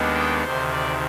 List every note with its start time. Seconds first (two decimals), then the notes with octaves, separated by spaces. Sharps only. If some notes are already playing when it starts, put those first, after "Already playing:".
Already playing: D#2 D#3 G#3 B3 D4
0.14 G5
0.44 D2 C3 D#3 C5
0.72 D5